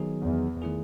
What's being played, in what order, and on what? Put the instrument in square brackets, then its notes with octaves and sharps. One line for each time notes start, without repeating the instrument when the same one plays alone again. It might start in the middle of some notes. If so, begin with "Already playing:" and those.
Already playing: [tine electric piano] D#3 F#3 B3 D#4 G#4
[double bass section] E2
[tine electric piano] D#3 A3 E4 G#4